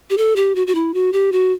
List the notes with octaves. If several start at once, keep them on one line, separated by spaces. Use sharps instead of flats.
G4
A4
G4
F#4
F#4
E4
F#4
G4
F#4